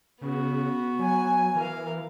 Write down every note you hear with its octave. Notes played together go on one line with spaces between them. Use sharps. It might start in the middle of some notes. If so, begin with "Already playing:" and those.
C#3 B3 F#4
F#3 G#5
E3 A#4 F5